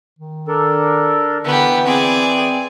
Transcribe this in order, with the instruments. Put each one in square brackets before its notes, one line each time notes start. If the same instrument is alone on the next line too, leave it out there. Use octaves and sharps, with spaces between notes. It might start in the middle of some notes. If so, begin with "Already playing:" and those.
[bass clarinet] D#3
[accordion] D4 A4 A#4
[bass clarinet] D3 [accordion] E3 [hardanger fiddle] B3 G4
[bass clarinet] C4 [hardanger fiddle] G#4 D5